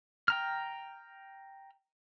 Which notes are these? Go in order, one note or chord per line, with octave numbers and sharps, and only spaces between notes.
G5 A#5 F6